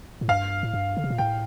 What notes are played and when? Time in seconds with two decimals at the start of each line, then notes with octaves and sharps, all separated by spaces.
0.21 A2
0.28 G2 F5
0.63 A2
0.74 G2
0.97 D3
1.04 C3
1.10 A#2
1.18 A2 G5